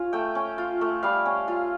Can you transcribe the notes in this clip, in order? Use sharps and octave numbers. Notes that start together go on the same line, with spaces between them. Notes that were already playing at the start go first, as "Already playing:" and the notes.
Already playing: C#4 F4
A3 G5
C#4
F4
A3
G3 F5
C#4
F4